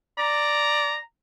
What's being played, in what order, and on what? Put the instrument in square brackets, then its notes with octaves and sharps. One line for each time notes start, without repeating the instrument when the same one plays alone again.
[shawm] D5 [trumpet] A#5